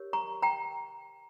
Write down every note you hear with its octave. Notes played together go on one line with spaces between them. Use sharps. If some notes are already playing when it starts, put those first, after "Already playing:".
Already playing: G4 A#4 C#5
A#5 C#6
G5 A#5